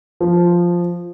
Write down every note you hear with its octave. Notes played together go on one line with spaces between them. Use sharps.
F3